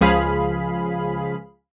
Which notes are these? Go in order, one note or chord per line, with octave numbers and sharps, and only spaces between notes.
C#2 F3 G#4 F5 B5